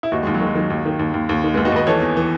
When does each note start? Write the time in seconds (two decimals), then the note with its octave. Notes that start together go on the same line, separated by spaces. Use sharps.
0.03 E4
0.12 D#2 D#4 F#4
0.23 D#2 G#3
0.34 F#3
0.41 D#3 G#3
0.55 D#3 F#3
0.70 D#2
0.85 D#3
0.99 D#2
1.14 D#2
1.29 D#2
1.44 D#3
1.54 D#2 G#3 B3
1.65 D#4 F#4
1.72 D#2 B4 D#5
1.87 E3 A4 C#5
2.01 E2
2.17 E3